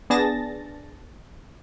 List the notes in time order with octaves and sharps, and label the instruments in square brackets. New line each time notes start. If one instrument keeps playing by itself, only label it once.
[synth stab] B3 D4 G#4 A5 A6 A#6